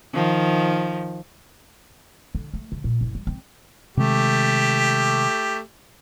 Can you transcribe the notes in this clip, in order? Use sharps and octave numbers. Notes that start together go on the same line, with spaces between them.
D#3 F3
D3
A3
C#3
A#2
F#1
G3
C4
C3 D#3 G#3 A3 G4